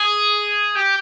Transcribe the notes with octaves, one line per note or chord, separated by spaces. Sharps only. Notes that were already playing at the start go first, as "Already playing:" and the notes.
Already playing: G#4
G4